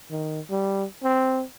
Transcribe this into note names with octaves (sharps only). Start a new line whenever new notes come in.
D#3
G3
C4